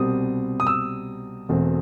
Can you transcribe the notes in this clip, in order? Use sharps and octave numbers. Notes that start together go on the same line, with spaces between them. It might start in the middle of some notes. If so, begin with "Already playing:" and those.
Already playing: C2 B2 G3 C4 D#6
D#6
E6
E1 E2 B2 A3 C4